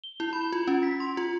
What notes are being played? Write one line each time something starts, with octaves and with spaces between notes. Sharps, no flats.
G7
E4
B5
F4
C#4
B6
C6
F4